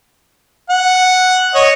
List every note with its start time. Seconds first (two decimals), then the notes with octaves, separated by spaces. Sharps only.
0.70 F#5
1.54 C#5 D#5